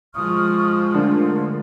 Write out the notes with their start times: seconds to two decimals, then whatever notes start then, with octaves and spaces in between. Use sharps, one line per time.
0.15 F3 G#3 C#6 D#6 F6
0.94 D3 A3 F4 A#4